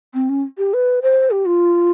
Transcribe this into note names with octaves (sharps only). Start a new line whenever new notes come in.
C4
C#4
G4
B4
C5
G4
F4